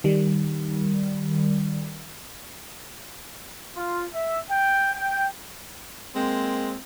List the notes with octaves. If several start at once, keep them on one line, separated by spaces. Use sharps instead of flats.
D#3 G3
F4
E5
G5
G5
G#3 A#3 C4